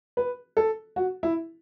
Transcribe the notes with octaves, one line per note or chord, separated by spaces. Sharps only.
B4
A4
F#4
E4